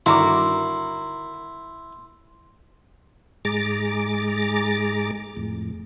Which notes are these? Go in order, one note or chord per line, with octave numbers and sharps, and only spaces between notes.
G2 D3 D#3 E4 F#4 A#4 C6 D6
G#2 G#3 G#4 A#5 D6 A6
F2 A2